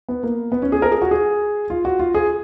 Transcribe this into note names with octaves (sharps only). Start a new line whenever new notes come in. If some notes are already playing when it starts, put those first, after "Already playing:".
B3
A#3
B3
C#4
G#4
A#4
G#4
F#4
G#4
F4
F#4
F4
G#4